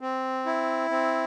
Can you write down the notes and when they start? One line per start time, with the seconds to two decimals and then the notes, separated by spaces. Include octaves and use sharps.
0.01 C4
0.46 E4
0.90 C4